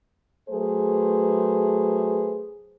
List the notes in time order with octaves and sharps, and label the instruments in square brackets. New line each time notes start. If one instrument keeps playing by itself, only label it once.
[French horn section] F#3 A3 G#4 B4 C5